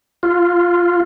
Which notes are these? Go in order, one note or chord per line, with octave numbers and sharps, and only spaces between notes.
F4